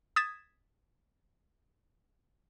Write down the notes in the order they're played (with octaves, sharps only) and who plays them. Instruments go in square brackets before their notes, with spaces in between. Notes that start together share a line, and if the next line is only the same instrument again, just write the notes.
[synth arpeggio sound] D#6 G#6 A6 B6 E7